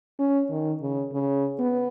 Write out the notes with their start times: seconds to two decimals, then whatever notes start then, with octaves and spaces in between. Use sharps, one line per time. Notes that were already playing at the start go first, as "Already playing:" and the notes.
0.19 C#4
0.50 D#3
0.82 C#3
1.13 C#3
1.60 B3